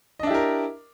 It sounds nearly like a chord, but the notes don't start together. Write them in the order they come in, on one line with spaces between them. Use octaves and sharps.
D#5 D4 E4 G4 A#4